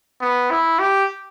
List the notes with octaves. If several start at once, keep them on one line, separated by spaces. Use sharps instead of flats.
B3
E4
G4